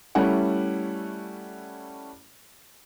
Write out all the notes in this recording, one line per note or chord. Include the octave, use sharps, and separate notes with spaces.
G3 A3 C#4 E4 F#5